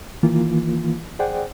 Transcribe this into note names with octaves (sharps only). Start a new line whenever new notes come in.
D#3 E3 A#3 F4
G#4 C5 D5 F#5 G5